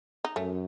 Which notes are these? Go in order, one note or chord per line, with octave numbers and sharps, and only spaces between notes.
D#4
F#2 A3 C#4